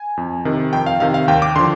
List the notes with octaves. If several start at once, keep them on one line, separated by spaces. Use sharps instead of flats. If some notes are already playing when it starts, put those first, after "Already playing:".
Already playing: G#5
F2
C3 D#3
F2 G5
F5
C3 D#3 F5
F5
D#2 G5
D6
D3 F3 C6